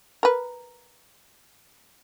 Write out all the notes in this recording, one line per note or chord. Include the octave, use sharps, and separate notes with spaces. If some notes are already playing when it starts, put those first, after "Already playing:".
A#4 B4